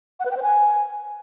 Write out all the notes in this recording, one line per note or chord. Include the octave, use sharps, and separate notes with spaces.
F#5
B4
G5
C5
G#5